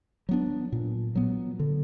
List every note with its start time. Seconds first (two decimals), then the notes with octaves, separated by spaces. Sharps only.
0.29 F#3 B3 D4
0.72 A#2
1.15 F#3 B3
1.59 D3